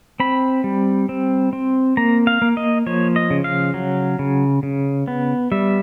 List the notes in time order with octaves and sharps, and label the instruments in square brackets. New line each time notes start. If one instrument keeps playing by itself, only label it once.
[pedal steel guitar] C4 B5
G3
C4
C4
A#3 A#5
F5
A#3
D#5
F3 C#5
D#5
C#3
F5
F#3
C#3
C#3
B3
G3 E5